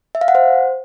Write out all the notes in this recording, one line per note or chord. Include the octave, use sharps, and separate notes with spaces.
E5
F5
F#5
C5